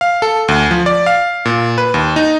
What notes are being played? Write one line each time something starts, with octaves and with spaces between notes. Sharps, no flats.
F5
A4
D2
F3
D5
F5
A#2
B4
D#2
D#4